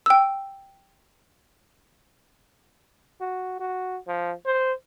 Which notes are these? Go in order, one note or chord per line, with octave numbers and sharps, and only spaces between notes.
G5 E6
F#4
F#4
F3
C5